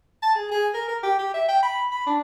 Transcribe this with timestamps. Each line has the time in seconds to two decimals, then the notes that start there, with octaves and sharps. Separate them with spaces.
0.23 A5
0.35 G#4
0.51 G#4
0.74 A#4
0.88 A#4
1.03 G4
1.19 G4
1.34 E5
1.48 G5
1.63 B5
1.92 B5
2.06 D4